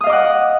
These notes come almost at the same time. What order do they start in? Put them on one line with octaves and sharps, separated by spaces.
D#6 F5 D#5 D6 F#5